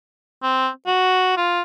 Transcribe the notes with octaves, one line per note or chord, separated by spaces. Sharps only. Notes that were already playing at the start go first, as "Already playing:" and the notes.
C4
F#4
F4